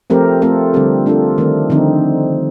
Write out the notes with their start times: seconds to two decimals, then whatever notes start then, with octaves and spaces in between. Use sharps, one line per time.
0.10 F3 A3 C4 G4 A#4
0.42 A3 C4 F4 A4
0.74 D3 G3 C4 G4
1.06 A3 D4 F4 A4
1.38 D#3 A3 C4
1.70 D3 F3 C4 D#4